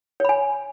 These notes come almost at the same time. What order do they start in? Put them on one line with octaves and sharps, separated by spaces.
C#5 B5 G#5